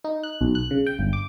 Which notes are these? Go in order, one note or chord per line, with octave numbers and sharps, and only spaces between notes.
D#4
F#6
B1
F#6
C#3
G5
G1
D6